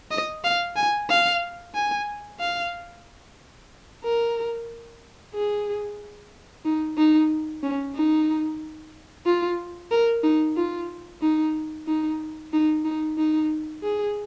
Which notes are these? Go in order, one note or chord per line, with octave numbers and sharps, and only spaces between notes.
D#5
F5
G#5
F5
G#5
F5
A#4
G#4
D#4
D#4
C#4
D#4
F4
A#4
D#4
F4
D#4
D#4
D#4
D#4
D#4
G#4